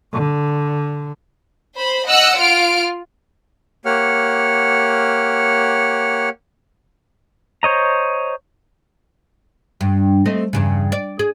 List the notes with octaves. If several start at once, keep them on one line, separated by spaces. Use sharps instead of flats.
D3
C5 B5
D#5 F#5 E6 F#6
F4 F6 D7
A#3 G4 C#5 F#5 F6
C5 C#5 D#5 A#5
G2
A3 C4 D#5
E2 G2 C#3
D5
G#4